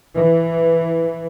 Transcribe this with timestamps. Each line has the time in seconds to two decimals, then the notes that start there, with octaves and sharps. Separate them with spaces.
0.16 E3